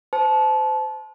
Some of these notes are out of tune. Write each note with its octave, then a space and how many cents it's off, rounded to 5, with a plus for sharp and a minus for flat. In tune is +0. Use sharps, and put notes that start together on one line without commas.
C5 -30 A5 -25